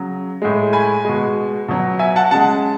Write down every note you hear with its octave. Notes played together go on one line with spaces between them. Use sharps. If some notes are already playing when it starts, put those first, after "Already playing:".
Already playing: C#3 F#3
A2 G#3
G#5 B5
B2 G#3
B2 F#3
E5 G#5
F#5 A5
C#3 G#3 F#5 A5